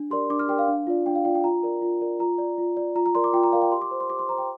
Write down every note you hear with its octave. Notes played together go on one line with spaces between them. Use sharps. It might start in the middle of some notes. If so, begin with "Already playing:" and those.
Already playing: D4
G4 A#4 D5 C6
D4 D6
F6
G4 A#4 D5 G5
F5
D4
F4 D5
D4 G5
F5
F4 D5 G5
G5
F4 A#5
A#4 D5
F4
A#4 D5
F4 A#5
D5
F4
D5
F4 A#5
A#5
A#4 D5 C6
D6
F4 G5
A#5
A#4 D5 F5
G5
G4 C6
D6
C5
C6
G4 D6
C6
C5 A#5
G5